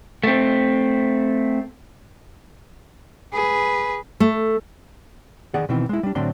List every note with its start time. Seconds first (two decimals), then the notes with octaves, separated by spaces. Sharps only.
0.24 A3 C4
3.33 G#4 B4
4.20 A3
5.54 D#3 G#4 D5 F#5
5.69 B2 D#3 E3 C4
5.89 G#3 E4
6.03 G3 D4
6.15 A2 D3 F#3 C4 D4 C6